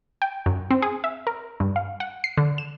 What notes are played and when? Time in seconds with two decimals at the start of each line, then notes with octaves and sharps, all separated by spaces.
0.22 G5
0.46 F#2
0.71 C4
0.82 G#4
1.04 E5
1.27 A#4
1.60 G2
1.76 F5
2.00 F#5
2.24 C7
2.37 D3
2.58 E7